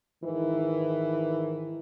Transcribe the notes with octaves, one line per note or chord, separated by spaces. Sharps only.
G#2 D#3 E3